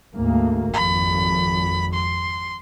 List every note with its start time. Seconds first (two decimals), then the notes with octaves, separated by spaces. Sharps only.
0.15 D2 G#2 A#3
0.74 G#1 F2 B5
1.94 C6